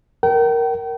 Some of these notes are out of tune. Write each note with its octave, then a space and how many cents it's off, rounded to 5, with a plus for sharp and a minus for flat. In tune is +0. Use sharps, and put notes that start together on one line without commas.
A#4 +0 G5 -35